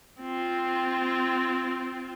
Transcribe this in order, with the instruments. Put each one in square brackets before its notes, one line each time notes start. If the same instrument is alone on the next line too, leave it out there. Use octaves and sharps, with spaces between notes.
[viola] C4 F4